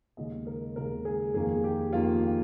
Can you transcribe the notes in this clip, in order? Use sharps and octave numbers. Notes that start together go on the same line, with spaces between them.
D#2 C#3 G#3 D#5
A#4
D#2 C#3 G#3 A#4
G#4
F2 D#3 A#3 G#4
G4
F2 D#3 A#3 F4